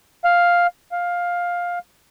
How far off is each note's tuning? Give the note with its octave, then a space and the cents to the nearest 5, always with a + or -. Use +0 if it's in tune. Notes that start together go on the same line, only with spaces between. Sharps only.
F5 +5
F5 +10